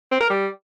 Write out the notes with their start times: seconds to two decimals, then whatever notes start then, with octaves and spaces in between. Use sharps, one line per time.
0.11 C4
0.21 A#4
0.30 G3